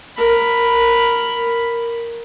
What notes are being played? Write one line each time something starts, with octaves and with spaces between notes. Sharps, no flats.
A#4 B5